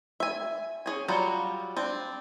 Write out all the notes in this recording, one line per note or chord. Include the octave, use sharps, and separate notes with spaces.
E5 G#5
C#4 G#4 G#5
F#3 G3 F4 F#4
C4 D4